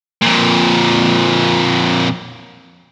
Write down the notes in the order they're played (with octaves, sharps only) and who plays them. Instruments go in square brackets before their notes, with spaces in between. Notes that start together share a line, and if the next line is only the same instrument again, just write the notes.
[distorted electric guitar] F2 A#2